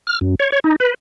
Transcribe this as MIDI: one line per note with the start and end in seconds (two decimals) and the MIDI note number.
0.07 0.19 89
0.21 0.35 42
0.40 0.50 73
0.52 0.60 73
0.64 0.76 63
0.80 0.94 71